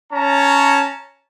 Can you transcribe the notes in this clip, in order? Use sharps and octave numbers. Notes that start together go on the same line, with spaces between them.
C#4 C#5 A5 A#5